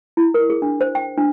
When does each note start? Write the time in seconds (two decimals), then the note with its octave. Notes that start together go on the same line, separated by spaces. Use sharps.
0.17 E4
0.34 A#4
0.50 G#4
0.62 D4
0.81 C5
0.95 G5
1.18 D4